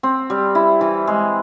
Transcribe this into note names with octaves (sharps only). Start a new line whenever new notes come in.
C4
G3
E4
E3
G#3